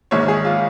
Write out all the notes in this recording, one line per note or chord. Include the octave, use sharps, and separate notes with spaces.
A#1 G#2 D#3 C#5
G#4
F4